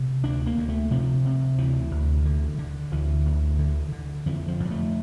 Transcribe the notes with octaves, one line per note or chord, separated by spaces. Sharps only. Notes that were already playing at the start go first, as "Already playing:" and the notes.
Already playing: C3
D2 D4
A#3
D2
A3
C3 F3
C3
D2 E3
D2
D3
D3
D2 E3
D2
D3
D3
F2 E3
F3
F2
G3
A3